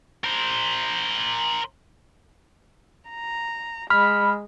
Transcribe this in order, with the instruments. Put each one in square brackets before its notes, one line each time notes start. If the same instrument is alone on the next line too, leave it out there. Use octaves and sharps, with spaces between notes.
[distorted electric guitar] A#4 C5
[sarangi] A#5
[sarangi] G#3 [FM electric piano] B5 [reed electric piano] F6